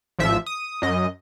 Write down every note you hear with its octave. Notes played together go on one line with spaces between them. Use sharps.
A1 F3 E5
D#6
F#2 D#5